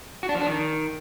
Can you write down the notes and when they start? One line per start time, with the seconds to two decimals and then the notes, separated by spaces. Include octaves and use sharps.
0.23 F#4
0.29 D4
0.35 F3
0.41 D4
0.47 D#3